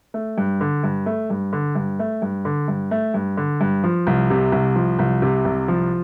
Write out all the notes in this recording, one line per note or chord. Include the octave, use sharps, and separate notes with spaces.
A3
G2
D3
G2
A3
G2
D3
G2
A3
G2
D3
G2
A3
G2
D3
G2
F3
C2
C3
C2
F3
C2
C3
C2
F3